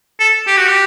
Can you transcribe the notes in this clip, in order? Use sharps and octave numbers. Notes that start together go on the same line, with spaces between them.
A4
G4
F#4
G4